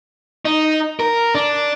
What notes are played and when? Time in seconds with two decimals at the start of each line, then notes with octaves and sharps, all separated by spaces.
0.45 D#4
1.00 A#4
1.35 D4